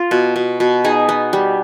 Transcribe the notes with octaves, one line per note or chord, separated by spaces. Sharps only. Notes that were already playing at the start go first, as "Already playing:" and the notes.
Already playing: F4
B2
B2
B2
D#4 G#4
B3
G3